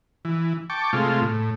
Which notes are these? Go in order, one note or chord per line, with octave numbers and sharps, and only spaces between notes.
E3
G5 A5 C#6 D6
C3 G#3 A3 F4
A2